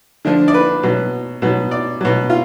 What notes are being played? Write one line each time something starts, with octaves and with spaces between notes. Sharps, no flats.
D3 F3 D4
D5
B4
B2 F#3
B2 F#3
D5
B2 F#3
F4